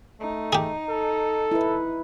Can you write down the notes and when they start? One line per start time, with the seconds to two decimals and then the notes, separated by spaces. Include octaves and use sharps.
0.20 A3 D#4
0.53 G4 G#4
0.89 A4
1.51 E4 B4